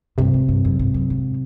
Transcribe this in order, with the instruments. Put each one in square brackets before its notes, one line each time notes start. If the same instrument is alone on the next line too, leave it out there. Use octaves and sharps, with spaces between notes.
[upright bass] G2 [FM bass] C3
[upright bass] G#2
G2
F#2
G#2
F#2
G#2